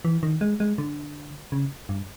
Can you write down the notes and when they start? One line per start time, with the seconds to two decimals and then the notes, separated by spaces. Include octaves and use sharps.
0.05 E3
0.23 D#3
0.41 G#3
0.60 G#3
0.78 D3
1.52 C#3
1.89 G2